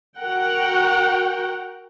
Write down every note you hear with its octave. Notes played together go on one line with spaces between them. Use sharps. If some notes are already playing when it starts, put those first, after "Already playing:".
F#4 A#4 F#5 G5